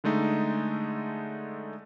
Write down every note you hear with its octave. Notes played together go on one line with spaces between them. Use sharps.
D3 G#3 A3 D#4